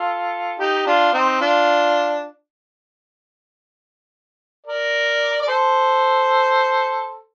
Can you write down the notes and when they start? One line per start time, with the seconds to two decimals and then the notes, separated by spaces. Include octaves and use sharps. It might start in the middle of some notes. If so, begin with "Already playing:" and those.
Already playing: F4 A4
0.60 D#4 G4
0.86 D4 F4
1.14 C4 D#4
1.41 D4 F4
4.66 A#4 D5
5.42 D5
5.48 A4 C5